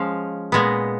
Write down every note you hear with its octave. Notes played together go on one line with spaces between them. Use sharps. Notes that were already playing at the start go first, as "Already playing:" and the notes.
Already playing: F3 G#3 C#4 F5
A#2 G#3 B3